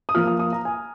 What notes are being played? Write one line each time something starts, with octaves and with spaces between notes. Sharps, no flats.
D#6
F3 A#3 F4 F6
D#6
D#6
A#5
G#5